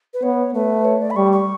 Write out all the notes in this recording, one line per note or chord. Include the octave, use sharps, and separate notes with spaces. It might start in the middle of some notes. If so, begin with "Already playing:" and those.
B4
B3 C#5
A3 B4
C#5
D5
B5
G3 C#6
C#6